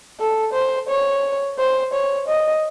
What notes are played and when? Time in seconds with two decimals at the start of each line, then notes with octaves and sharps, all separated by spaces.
0.20 A4
0.54 C5
0.89 C#5
1.59 C5
1.93 C#5
2.28 D#5